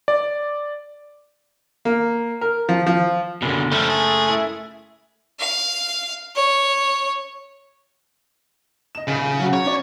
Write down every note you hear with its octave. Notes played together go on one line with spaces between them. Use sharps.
D5
A#3
A#4
F3
F3
F#1 B2 D3
F3 G3 A3
G#4
E4
F5
C#5
D#5 E7
D#1 C#3
F#3 F#4
C#5
C#4 F#4 D5